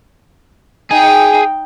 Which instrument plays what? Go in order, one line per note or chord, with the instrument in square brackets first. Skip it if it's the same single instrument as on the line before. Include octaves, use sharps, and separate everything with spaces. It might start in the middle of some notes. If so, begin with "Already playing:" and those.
[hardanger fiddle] D#4 G5 [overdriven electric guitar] G#4